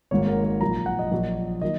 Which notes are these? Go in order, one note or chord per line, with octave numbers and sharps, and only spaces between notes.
G#1 G#2 D#3 A#3 C#5
A#4
A#4
A#1 A#2 F#3 A#3 A#5
F#5
D#5
A#1 A#2 F#3 A#3
D#3 F#3 A#3 D#5